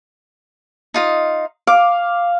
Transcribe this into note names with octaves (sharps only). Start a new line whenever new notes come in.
D#4 F4 D#5
F5 D6